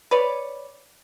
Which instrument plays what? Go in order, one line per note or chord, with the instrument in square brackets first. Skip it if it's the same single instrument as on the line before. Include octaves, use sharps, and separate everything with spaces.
[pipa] B4 C#5 D5